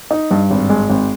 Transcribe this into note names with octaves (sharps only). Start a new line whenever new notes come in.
D#4
G2
G#1
G#3
G#1